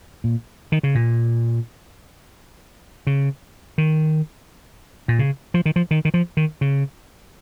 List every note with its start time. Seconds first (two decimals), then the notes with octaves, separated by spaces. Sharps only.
0.24 A#2
0.72 D#3
0.83 C#3
0.95 A#2
3.07 C#3
3.78 D#3
5.08 A#2
5.19 C#3
5.54 F3
5.66 D#3
5.76 F3
5.91 D#3
6.05 D#3
6.14 F3
6.37 D#3
6.61 C#3